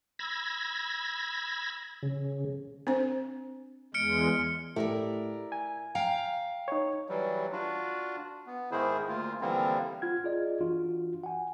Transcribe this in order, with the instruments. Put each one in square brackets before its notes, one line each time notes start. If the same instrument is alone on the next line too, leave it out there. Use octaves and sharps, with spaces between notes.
[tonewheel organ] B5 E6 G#6 A#6
C#3
[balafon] C4 D4 C5
[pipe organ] E2 G#3 [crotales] F6 C#7 D7
[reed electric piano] A2 A3 G4 [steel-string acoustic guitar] E4 A#4 D5
[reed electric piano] G#5
[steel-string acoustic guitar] F5 G5 A#5
[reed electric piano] D#4 C#5
[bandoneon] E3 F#3 G3
D4 F4 F#4
B3
G#2 D#3 E4 G#4 C5
D2 A#3 F4
D3 E3 F3 G3 A#3 C4
[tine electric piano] F4 F#5 F6 G#6
F4 G#4 D5 D#5
E3 D4 F4 F#4
F#5 G#5